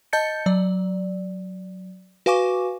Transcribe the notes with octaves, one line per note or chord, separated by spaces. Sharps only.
D#5 A5 G6 A6 C#7
F#3 D5
F#4 B4 F5 G#5 C#6 D6